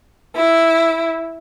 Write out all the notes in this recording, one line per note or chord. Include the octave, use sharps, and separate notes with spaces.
E4